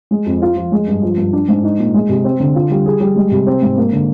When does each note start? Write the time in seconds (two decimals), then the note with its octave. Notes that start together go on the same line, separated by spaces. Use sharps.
0.11 G#3
0.26 F2
0.42 F4
0.56 F3
0.72 G#3
0.87 G2
1.02 F3
1.18 G2
1.33 D4
1.48 G#2
1.63 D#4
1.79 A#2
1.94 G#3
2.09 C3
2.24 C4
2.40 D3
2.55 F4
2.70 G3
2.86 G#4
3.00 G3
3.16 G#3
3.31 C3
3.46 C4
3.62 G#2
3.77 A#3
3.93 D3